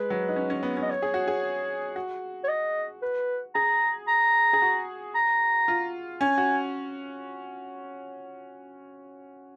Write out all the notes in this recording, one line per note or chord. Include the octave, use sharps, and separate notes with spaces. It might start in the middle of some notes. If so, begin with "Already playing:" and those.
Already playing: G#3 B4
F#3
D#4
C#4
C#4
B3
C#4
D#5
C#5
G#4
F#4
G#4
F#4
C#5
D#5
B4
G#4 A#5
A#5
G#4
F#4
A#5
F4
C#4 G#5
F#4